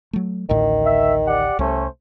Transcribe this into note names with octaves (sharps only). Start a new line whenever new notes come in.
F#3 A3
A1 D2 A2 D#3
E5
G4 D5 F#5
C2 A3 C#4 C5